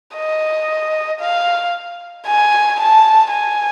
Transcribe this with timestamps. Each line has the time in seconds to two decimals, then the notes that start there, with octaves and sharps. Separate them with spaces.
0.16 D#5
1.20 F5
2.27 G#5
2.80 A5
3.31 G#5